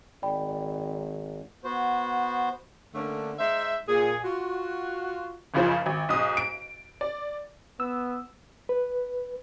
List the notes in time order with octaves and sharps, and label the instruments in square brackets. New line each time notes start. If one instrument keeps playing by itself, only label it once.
[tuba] G#1 [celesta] D5 G5 B5
[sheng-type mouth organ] B3 F#4 C5
[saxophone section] D3 A3 A#3 C#4 D4
G#3 D#4 C5 E5
A#2 G#4
F4 F#4
[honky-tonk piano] F#1 C#2 C#3 F3 C5
G#1
B1 G#2 D#6
D7
D5
[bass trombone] B3 [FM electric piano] E6
[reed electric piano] B4